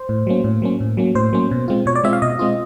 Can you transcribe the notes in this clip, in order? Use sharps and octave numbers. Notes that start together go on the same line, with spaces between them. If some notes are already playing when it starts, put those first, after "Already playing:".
Already playing: C5
A2
F#3 A#3 C#4
A2
F#3 A#3 C#4
A2
F#3 A#3 C#4
A2 C5
F#3 A#3 C#4
B2
G#3 C4 F4
B2 C#5
D5
G#3 C4 F4 E5
F5
B2 D#5
G#3 C4 F4